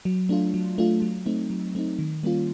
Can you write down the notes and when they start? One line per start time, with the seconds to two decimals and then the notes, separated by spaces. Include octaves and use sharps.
0.05 F#3
0.29 A3 D4 F4
0.54 F#3
0.78 A3 D4 F4
1.02 F#3
1.26 A3 C4 D#4
1.50 F#3
1.75 A3 C4 D#4
1.99 D#3
2.23 G3 A#3 C#4 F4